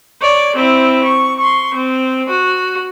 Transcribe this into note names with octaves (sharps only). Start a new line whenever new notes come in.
C#5 D5
C4 E4
C#6
C6 C#6
C4
F#4